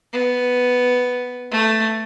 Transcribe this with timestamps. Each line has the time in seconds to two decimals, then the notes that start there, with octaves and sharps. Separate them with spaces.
0.13 B3
1.51 A3